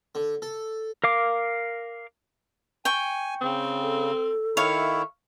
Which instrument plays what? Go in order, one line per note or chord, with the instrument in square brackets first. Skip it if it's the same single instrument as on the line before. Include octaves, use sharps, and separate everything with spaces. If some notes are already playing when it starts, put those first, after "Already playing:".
[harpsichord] D3
A4
[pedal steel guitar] A#4 F5 D6
[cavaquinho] G5 C#6 [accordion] G#5
[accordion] C#3 [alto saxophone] C4
[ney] A4
[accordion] D#3 E4 [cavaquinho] C#5 F5 [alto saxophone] E5